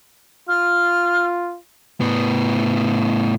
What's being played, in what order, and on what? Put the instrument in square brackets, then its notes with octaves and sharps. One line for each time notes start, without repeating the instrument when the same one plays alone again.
[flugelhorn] F4 [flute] F6
[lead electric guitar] A2 B3